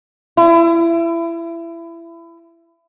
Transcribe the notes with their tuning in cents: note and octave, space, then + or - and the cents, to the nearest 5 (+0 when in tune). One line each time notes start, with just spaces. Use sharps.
E4 +25